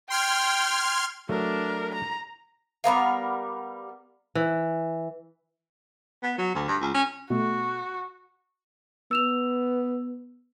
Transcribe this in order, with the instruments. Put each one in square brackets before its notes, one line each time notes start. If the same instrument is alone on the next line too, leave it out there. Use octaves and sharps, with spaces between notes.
[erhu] G5 [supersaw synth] C6 F6 G#6
[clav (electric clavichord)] F#3 A3 E5 [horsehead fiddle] D4 A#4
[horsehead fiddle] A#5
[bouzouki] G3 B3 A#4 F5
[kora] E3
[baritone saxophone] B3
F#3
D2
G2
C#2
C#4
[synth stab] B2 A3 [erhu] F#4
[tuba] B3 [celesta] E6 E7 F7